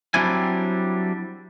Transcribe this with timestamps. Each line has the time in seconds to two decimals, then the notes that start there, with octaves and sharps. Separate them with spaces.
0.14 F#3 G3 C4 D4 E4 G#5